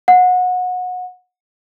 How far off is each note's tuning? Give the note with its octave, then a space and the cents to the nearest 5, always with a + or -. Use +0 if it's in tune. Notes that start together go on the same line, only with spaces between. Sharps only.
F#5 -25